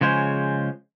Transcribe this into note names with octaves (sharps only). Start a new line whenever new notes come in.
C#3 F3 G#3 C5 C#5